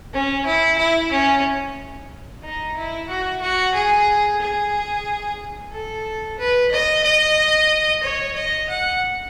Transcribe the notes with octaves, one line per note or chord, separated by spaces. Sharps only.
C#4
E4
E4
C#4
D#4
E4
F#4
F#4
G#4
G#4
A4
B4
D#5
D#5
C#5
D#5
F#5